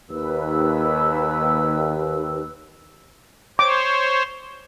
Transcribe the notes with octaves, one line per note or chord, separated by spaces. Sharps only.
D#2 B4 E6
C5 C#5 D6